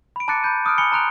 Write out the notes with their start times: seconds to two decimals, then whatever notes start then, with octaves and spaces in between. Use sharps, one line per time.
0.16 B5 D7
0.28 A5 A#5 D6 F#6 A6 C#7
0.43 B5 G6 D#7
0.65 D6 D#6 F6 F#6 D7
0.78 G#5 B5 C#7 G7
0.92 A5 A#5 C6 F#6 D7 F7